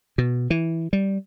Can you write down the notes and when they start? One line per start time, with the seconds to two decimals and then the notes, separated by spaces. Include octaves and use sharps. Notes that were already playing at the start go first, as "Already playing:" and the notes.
0.18 B2
0.50 E3
0.93 G3